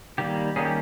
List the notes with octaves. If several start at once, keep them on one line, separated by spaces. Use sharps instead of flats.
D#3 G3 A#3 G4
D#3 G3 A#3 C#4 G#4
G4